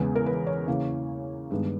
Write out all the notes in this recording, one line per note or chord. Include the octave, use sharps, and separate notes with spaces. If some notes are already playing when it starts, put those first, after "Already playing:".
Already playing: E2 C#3 G#3 B3
A#4
B4
C#5
C#3 E3 A#3
G2 D#3 G#3 B3